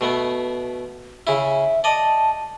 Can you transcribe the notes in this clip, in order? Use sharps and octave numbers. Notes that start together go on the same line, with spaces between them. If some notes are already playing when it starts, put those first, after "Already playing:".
B2 A3 B3
C#3 E4 E5
D5 D#5 A5